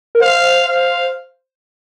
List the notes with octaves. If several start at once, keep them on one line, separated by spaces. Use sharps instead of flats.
A#4
C5 F5
F5